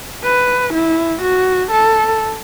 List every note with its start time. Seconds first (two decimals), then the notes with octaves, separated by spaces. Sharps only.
0.24 B4
0.74 E4
1.21 F#4
1.71 A4